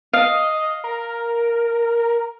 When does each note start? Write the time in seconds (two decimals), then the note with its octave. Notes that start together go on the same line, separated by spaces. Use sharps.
0.13 D#5 F5
0.84 A#4